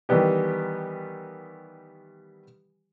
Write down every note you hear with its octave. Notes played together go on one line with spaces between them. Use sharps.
D#3 E3 G3 B3 G4